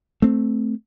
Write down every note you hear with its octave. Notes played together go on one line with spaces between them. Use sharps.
A3 C4